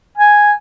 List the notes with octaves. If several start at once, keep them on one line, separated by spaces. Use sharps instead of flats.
G#5